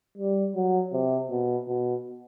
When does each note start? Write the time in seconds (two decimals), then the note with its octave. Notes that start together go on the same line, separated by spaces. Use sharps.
0.18 G3
0.55 F#3
0.93 C3
1.30 B2
1.68 B2